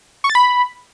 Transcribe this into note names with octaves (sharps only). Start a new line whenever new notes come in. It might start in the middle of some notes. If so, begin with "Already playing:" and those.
C#6
A6
B5